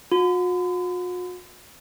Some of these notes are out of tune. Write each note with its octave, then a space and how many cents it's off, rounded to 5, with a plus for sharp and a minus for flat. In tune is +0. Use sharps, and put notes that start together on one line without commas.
F#4 -45